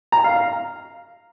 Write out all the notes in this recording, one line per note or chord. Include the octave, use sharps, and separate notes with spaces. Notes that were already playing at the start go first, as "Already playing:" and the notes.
A#5
F5
F5